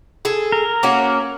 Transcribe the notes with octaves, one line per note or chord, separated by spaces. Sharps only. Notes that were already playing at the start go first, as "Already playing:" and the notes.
G#4 A4
A#4
A#3 C#4 F#4